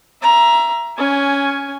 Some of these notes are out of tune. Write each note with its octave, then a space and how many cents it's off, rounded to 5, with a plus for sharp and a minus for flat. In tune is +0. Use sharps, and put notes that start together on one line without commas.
E5 +30 A#5 +15
C#4 +10 G#5 +0